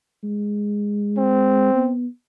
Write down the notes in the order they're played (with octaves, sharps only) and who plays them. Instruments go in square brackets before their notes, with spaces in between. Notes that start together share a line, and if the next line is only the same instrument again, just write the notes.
[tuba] G#3
[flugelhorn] C4
[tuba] B3